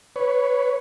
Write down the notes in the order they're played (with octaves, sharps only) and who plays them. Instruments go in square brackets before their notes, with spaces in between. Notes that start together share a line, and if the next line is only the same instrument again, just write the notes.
[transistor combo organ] B4 C#5